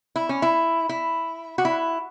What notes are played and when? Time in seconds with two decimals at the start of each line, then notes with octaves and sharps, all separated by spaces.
0.16 E4
0.29 C#4
0.42 E4
0.89 E4
1.58 F#4
1.65 E4